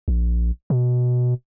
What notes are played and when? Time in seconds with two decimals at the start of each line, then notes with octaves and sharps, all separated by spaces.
0.08 A#1
0.70 B2